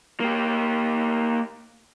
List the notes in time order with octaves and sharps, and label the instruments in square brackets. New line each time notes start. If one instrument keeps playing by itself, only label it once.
[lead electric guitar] A#3 G4